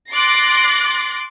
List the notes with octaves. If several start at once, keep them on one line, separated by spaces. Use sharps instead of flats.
C6 D6 F#6 A6 A#6 C7